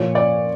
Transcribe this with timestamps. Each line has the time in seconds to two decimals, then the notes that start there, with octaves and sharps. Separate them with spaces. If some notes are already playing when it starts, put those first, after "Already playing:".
Already playing: A#2 F3 C#5
0.15 D5